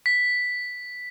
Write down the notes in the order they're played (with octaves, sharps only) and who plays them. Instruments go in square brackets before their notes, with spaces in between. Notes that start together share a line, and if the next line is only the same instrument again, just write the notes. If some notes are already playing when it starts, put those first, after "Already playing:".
[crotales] B6